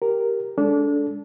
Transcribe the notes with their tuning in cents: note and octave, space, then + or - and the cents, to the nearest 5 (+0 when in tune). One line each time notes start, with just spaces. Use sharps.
G4 +0 A#4 +0
G#3 -10 D4 -25 A4 -5